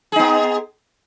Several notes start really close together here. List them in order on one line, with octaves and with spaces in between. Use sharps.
G#4 D#4 B3